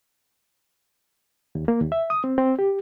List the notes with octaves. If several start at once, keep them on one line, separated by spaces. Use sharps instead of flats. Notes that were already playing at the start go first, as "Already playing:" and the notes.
D#2
A#3
D#2
E5
D#6
C4
C4
G4